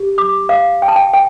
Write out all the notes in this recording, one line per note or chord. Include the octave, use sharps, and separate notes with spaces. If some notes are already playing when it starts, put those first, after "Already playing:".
Already playing: G4
D6
F5
G5
A5
G5
G5